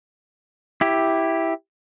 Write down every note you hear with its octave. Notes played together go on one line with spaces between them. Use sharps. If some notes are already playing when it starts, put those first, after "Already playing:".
E4 G4